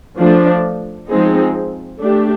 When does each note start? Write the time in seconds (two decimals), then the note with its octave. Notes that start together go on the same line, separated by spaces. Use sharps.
0.18 F3 A3 D4
1.09 F3 G#3 C4 D#4 G#4
1.99 A3 D4 G4